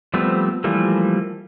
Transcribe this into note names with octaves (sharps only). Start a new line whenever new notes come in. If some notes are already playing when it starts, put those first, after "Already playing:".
F3 G3 A3 B3 C4
E3 F3 G3 A3 A#3